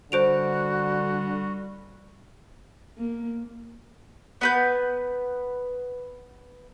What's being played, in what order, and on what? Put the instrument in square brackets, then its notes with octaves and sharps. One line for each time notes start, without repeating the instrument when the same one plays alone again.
[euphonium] D3 [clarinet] G3 [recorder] F#4 [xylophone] C5 D7 F7
[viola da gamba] A#3
[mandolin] B3 B4 G6